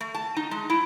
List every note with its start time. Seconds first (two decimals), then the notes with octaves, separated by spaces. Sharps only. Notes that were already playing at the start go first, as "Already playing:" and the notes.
0.01 A3
0.15 A5
0.36 D#4
0.51 G#3
0.70 E4